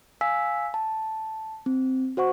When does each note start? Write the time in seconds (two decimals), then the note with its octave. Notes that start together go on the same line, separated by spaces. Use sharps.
0.21 F5 G#5 E6 B6
0.74 A5
1.66 C4
2.17 F#4 C5 F#5 C#6